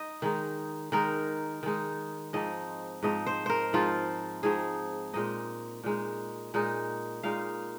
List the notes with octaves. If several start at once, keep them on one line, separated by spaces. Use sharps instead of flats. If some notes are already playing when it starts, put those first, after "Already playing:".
Already playing: D#4 D#5
D#3 G#3 D#4
D#3 G#3 D#4 A#4
D#3 G#3 D#4
G#2 F3 C4 D#4 D#5
G#2 F3 C4 D#4 D#5
C5
A#4 C5
G#2 F3 C4 D#4 F4
G#2 F3 C4 D#4 G#4
A#2 G#3 D#4 D#5
A#2 G#3 D#4
A#2 G#3 D#4
A#2 G#3 D#4 F5